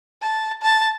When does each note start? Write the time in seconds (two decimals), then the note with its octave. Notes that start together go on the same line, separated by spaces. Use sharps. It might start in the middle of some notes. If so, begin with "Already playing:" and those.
0.22 A5
0.62 A5